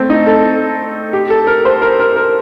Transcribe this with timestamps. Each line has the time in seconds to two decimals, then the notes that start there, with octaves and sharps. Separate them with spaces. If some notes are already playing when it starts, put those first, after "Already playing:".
Already playing: A3 C4
0.10 D#4
0.26 A4
1.13 G4
1.30 A4
1.47 A#4
1.65 C5
1.82 A#4
1.99 A#4
2.16 A#4